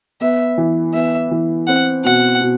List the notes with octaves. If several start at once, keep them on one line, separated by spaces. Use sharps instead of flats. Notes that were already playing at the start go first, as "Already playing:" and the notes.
B3 E5
E3
B3 E5
E3
C4 F#5
B2 F#5
B2